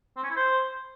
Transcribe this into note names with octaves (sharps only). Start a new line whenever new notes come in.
C4
C#4
E4
C5